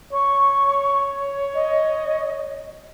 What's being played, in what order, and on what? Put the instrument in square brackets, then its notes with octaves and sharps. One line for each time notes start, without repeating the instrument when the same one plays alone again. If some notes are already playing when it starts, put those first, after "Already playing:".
[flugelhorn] C#5 [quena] C#6
[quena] D#5